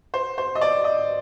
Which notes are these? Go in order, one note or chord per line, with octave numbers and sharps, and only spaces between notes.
C5
C5
D#5
D5
D#5